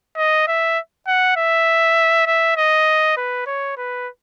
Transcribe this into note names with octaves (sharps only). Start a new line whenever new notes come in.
D#5
E5
F#5
E5
E5
D#5
B4
C#5
B4